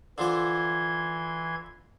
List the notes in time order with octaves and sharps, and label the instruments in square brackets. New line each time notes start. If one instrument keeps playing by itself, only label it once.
[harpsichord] D3 F3 A4 [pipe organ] E3 C6 G#6